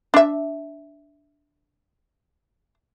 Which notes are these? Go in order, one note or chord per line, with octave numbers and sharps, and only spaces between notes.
D4 E5